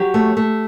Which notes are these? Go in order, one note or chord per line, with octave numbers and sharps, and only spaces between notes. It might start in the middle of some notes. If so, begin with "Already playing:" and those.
Already playing: F#3 G4
A3
A3